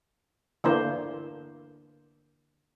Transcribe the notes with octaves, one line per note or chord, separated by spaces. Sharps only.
D3 E3 A#3 C5